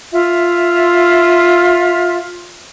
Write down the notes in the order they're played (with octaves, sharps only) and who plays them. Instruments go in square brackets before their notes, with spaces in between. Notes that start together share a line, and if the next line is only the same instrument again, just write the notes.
[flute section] F4 E5